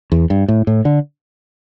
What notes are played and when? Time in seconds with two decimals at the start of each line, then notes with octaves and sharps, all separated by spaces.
0.12 E2
0.30 G2
0.48 A2
0.67 A2
0.85 D3